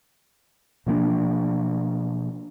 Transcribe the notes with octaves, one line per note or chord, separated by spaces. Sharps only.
B2 F3 A#3 D4